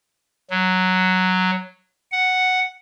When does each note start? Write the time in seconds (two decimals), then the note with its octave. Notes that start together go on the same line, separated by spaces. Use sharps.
0.51 F#3
2.12 F#5